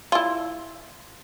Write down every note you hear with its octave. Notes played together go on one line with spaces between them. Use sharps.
E4 F4